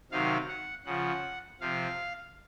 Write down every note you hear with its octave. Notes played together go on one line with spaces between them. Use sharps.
C3 D#3 F#3 F5
F#5
C#3 F3 F#5
C3 F3 F5